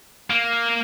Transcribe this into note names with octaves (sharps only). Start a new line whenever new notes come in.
A#3